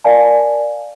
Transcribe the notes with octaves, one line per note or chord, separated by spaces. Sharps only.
A#4 D5 F5 G#5 A5